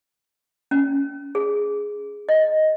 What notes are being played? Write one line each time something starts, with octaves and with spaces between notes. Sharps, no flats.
C#4
G#4
D#5